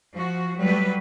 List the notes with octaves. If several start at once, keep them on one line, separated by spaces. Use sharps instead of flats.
F3 F#4
F#3 G3 A3 B4